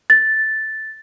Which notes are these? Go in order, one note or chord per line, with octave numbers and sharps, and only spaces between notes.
A6